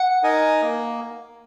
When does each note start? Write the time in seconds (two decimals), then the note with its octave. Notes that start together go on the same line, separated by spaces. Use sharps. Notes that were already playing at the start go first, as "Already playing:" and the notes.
Already playing: F#5
0.23 D#4 A#4 D#5 G#5
0.62 A#3